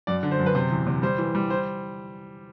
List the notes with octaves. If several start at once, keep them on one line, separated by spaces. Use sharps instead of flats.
F#2 D5
D3
C5
F#2
B4
C3 C5
E2
C3
G3 C5
E3
G3
C5